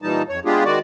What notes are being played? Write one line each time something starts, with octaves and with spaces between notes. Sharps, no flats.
A#2 E3 G3 D#4 A5
F2 C#5
G#3 B3 D4 F4 G4 G#4
D#3 G#3 F#4 D5